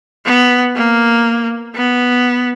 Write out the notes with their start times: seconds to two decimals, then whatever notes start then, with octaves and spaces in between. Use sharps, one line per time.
0.26 B3
0.76 A#3
1.75 B3